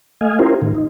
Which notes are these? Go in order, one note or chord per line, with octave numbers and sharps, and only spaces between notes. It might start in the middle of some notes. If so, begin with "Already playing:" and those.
A3 D#5 F5 G#5
C#4 E4 F4 G4 A#4 C5
A2 D#3
D#4